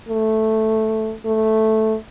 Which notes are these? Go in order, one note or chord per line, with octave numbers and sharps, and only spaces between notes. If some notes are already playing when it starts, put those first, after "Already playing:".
A3
A3